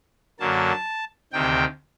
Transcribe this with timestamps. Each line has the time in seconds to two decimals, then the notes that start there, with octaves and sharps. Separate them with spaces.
0.40 F#2 D3 F#3 A#3 A5
1.32 D2 C3 D#3 G5